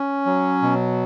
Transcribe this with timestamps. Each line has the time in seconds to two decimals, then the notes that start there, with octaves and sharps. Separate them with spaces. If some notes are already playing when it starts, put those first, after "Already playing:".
Already playing: C#4
0.26 F#3
0.62 B2